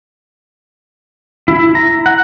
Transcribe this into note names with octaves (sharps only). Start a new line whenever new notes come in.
E4
A#5
F#5